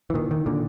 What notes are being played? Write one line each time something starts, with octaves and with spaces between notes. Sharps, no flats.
E3
A#2 D#3
D#3
A#2 D3